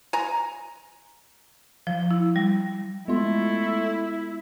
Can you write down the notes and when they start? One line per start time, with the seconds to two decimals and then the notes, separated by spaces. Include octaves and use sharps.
0.13 G#5 A#5
1.87 F3
2.11 E4
2.36 G3
3.08 G#3 A3 B3 E4 F4